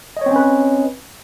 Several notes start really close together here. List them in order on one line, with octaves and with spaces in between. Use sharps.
D#5 C#5 C4 C#4 B4